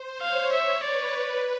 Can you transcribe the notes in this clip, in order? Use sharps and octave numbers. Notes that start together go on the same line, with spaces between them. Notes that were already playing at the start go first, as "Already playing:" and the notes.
Already playing: C5
C#5 F5
C#5 E5
B4 D5
B4